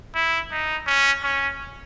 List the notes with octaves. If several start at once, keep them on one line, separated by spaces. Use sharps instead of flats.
E4
D#4
C#4
C#4